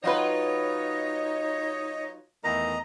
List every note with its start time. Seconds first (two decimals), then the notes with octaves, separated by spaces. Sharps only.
0.04 F#3 D#4 F4 B4 C#5 D#5
2.44 E2 D#3 A3 D#5 A#5